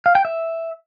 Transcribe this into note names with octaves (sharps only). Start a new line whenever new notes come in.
F5
G5
E5